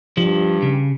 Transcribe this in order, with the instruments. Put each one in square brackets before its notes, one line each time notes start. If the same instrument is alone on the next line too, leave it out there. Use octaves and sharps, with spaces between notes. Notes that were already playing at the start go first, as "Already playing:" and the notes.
[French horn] G2 [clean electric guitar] F3
[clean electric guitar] C#3